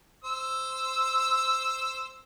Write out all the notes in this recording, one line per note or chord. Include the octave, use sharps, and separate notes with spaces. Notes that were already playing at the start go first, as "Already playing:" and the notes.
C5 E6